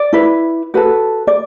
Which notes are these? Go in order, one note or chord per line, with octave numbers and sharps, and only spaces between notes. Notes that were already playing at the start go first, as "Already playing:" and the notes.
Already playing: D5
E4 B4
F#4 A4 B4
D5